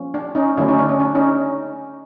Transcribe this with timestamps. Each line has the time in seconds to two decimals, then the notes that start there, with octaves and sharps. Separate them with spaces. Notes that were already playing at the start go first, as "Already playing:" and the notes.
Already playing: F3 A#3 C#4
0.14 D4
0.35 C#4 D#4
0.57 D3 F#3 A3 C#4 D4 E4
0.68 C#4 D#4
0.78 D4
0.89 C#4
1.00 D4
1.15 C#4 D#4